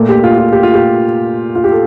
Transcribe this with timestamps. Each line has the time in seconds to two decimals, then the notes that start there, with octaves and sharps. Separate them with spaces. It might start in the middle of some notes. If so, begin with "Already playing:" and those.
Already playing: A#2 A3
0.09 G4
0.24 F4
0.38 F4
0.53 G4
0.63 F4
0.74 G4
1.55 F4
1.64 G4
1.72 A4